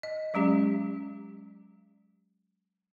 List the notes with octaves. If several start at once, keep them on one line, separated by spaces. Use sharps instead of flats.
D#5
F#3 G#3 C#4 G4